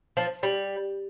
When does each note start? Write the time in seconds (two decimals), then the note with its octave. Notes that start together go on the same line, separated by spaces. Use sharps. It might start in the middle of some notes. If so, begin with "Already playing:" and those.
0.17 F3
0.43 G3